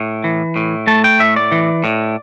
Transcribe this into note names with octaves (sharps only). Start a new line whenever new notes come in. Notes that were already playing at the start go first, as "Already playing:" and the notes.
Already playing: A2
E3
A2
A3 A5
G5
A2 E5
D5
E3
A2